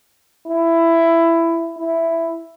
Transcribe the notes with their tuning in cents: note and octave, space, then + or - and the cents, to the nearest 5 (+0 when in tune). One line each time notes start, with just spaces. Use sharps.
E4 +15
E4 +5